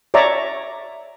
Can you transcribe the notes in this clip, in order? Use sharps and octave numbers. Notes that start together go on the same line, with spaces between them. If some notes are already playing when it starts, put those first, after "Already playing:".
C#5 D5 E5 A#5